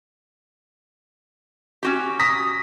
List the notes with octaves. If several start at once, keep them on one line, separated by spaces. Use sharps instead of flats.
C#4 F#4 G4
D#6 A#6 B6